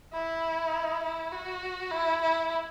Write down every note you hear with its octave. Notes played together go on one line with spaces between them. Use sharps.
E4
E4
F#4
E4
E4